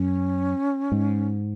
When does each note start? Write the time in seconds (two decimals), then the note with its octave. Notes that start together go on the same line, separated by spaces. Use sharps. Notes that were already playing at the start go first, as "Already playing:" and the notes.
Already playing: F#2 C#4
0.92 G#2